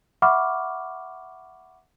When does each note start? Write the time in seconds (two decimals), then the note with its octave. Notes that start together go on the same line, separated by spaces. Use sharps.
0.22 E5 F#5 B5 C#6 D6 F6